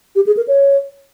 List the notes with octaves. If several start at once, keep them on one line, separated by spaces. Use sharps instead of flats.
G4
G#4
A#4
C#5